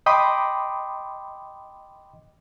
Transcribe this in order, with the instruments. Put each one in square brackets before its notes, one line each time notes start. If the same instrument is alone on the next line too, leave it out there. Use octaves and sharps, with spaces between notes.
[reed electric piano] D#5 G5 B5 C6 D6 D#6